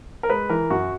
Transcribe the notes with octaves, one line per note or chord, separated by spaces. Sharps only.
A#4
G#3 B4
E3 A#4
F#2 F#4